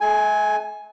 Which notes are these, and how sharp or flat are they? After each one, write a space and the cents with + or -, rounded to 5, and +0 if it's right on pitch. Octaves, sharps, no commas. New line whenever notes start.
A3 -45 A4 -40 G#5 +5